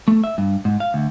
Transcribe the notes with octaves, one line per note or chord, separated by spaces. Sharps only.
A3
E5
G2
G#2
F5
D2